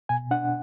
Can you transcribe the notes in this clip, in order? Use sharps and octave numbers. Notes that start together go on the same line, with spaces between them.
B2 G#5
D4 F#5